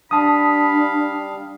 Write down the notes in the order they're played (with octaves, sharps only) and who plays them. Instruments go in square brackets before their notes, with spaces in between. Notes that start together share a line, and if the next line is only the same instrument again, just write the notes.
[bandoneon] G3 F5 [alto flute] D4 [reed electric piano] A5 D#6 [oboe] B5